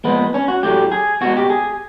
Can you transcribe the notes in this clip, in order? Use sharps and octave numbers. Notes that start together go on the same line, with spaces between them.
A#2 F3 G#3 B3
C#4
F#4
A2 F#3 A3 G4
G#4
B2 G#3 F#4
G4
G#4